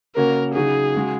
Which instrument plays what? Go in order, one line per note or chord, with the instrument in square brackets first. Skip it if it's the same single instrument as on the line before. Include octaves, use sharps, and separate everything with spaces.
[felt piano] C#3 A#3 C#4 F#4 [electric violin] A#4
[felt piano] C#3 F#3 D#4 F#4 [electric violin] G#4
[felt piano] C#3 G#3 F#4